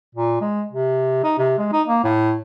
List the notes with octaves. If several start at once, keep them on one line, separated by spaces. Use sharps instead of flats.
A#2
G#3
C3
D#4
C3
G#3
D#4
A#3
A2